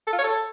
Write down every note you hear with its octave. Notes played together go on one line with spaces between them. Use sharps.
A4
F4
C#5
A4